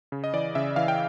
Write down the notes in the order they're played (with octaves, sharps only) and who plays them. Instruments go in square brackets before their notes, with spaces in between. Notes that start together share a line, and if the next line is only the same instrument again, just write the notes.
[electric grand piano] C#3
D#5
E3 D5
C#3 E5
E3 F5
G5